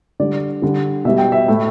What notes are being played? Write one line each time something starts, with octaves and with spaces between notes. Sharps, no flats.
D3 G3 D5
D3 G3
B2 G3 E5
G5
E5
A2 A3